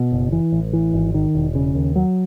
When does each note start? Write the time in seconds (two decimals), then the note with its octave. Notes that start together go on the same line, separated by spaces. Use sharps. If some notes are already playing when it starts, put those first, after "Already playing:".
Already playing: B2
0.12 F#1
0.32 E3
0.52 A1
0.73 E3
0.94 G#1
1.14 D#3
1.35 E1
1.55 C#3
1.75 D#2
1.96 F#3